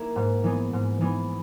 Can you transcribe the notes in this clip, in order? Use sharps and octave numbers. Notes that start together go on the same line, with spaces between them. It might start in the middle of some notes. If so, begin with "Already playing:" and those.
Already playing: A#3 E4
G#2
E3 B3
G#2
E3 B3